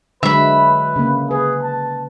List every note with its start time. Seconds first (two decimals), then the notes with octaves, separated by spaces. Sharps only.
0.23 D3 F#3 G#3 B4 E5 B5
0.96 C#3 A#3
1.31 G#4 B4
1.63 A5